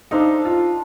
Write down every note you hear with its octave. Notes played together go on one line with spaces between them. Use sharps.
D4 D#4 A4 C5 F5
F4